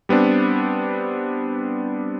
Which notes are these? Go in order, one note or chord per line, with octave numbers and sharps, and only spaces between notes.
G3 B3 C4 D4